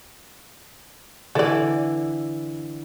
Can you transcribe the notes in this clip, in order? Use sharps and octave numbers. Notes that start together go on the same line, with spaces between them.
D3 E3 A4 D5